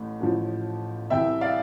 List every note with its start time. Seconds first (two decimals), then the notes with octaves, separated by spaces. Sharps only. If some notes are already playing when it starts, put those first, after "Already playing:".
Already playing: A1 A2
0.21 A1 A2 F3
1.10 C2 C3 E3 E5 G5
1.41 D5 F5